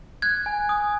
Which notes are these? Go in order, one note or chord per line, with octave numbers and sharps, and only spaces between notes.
F#6 G#6
G#5
D#6